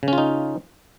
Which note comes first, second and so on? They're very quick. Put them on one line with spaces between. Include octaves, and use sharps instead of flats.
C#3 C#4 F4 D#4